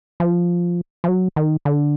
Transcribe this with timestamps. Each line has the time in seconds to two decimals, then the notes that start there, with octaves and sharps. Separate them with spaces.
0.20 F3
1.04 F3
1.08 F#3
1.36 D#3
1.65 D3